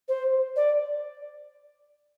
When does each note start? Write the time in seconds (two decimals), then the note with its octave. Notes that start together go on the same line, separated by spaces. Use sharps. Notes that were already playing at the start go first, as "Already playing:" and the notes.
0.08 C5
0.56 D5